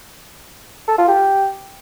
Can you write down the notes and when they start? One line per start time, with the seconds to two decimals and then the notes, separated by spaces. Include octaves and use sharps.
0.88 A4
0.98 F4
1.08 G4